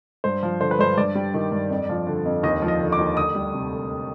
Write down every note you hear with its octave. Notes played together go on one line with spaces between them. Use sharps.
G2 C5
F3
D3 C5
B4
G2 C5
G2 D5
G3
D#3
G2
F2
F3
D3
F2
D#2 D#5
F3
D#5
D3
D6
D#2
D2 D#6
G3
C3
D2